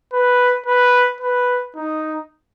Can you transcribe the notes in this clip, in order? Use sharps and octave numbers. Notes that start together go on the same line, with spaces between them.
B4
B4
B4
D#4